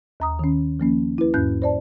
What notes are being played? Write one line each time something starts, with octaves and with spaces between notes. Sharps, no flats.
D#2 A#5 D#6
D#3 C#4
F3 A#3 C#4
E4 B4
E2 G#2 C#4 F#6 G6
C5 D5 A5